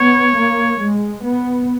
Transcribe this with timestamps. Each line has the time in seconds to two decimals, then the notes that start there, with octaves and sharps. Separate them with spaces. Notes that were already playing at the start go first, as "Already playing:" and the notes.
Already playing: B3 C#5
0.38 A#3
0.82 G#3
1.27 B3